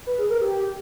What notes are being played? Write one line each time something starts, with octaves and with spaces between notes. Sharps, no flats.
B4
G#4
A#4
G4